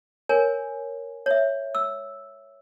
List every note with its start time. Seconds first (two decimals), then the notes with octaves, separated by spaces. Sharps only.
0.29 A#4 C#5 G#5
1.26 C#5 E5
1.75 E6